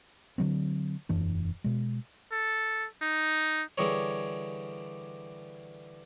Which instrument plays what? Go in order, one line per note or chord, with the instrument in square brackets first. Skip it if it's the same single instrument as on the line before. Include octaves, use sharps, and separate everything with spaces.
[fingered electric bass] D3 F#3 C4
E1 F#2 E3 D4
B2 G#3
[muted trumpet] A4
D#4
[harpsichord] D3 E3 G3 G#4 A#4 C#5